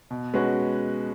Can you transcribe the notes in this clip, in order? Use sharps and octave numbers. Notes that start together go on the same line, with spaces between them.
B2
G#3 C#4 F#4 B4